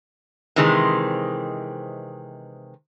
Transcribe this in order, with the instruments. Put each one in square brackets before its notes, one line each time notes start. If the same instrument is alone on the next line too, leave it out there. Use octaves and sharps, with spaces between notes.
[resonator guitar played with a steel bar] C3 D#3 E3 G#3 C4